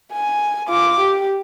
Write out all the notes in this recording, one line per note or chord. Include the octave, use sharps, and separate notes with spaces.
G#5
F4 D6
G4